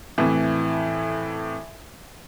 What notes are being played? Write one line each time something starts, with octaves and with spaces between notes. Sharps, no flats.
F2 A2 E3